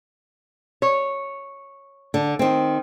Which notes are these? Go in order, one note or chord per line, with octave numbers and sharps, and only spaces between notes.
C#5
D3
D#3 C4